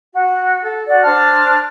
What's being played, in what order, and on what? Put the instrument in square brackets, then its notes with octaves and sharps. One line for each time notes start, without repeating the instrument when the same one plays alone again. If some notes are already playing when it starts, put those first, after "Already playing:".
[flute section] F#4
A4
F#4 D5
D4 C5 A5 F6